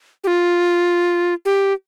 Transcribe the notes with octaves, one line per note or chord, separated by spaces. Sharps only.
G4
F4
G4